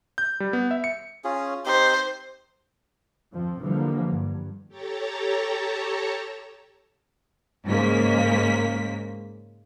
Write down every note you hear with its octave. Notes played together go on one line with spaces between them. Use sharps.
G6
G3
B3
E5
C#7
C#4 F4 G#4
C4 D#4 G4 C5
F2 F3 C4
D3 E3 F3 G3 A#3
G2
G4 A4 C#5 A5 A#5
G#2 C#3 G#3 A#3 B6